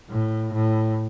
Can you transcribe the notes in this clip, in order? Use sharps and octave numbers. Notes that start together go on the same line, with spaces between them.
A2
A2